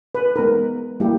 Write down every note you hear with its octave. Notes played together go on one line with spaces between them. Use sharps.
B4
G#3 B3 D#4 A#4
G3 A#3 E4 G4